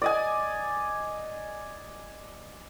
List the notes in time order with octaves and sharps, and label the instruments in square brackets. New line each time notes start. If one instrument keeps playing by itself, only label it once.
[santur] D5 D#5 G#5